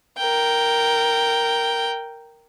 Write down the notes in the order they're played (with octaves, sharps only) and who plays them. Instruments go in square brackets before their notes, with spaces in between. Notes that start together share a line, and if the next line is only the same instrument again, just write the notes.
[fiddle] A#4 G5